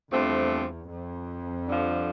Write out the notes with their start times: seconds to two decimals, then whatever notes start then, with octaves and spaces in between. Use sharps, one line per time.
0.10 E2 G2 F3 A3 C4
0.88 F2
1.66 G2 D3 F3